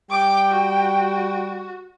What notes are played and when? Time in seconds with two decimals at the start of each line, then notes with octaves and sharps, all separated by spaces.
0.10 G3 G5 D6
0.51 F#4